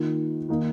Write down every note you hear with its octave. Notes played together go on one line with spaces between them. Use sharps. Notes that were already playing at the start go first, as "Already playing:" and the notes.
Already playing: D#3 A#3 F4
D#3 A#3 D#4